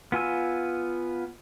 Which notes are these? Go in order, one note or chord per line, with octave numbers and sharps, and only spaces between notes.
B3 F4 G#5 E6